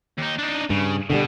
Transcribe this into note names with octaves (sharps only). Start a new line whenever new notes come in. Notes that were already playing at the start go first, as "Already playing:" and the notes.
D#2 D#4
D4 D#4
G2 C#3
B2 D3 D#3 G3